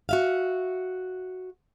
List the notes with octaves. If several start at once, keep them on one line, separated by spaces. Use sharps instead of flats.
F#4 E5 F5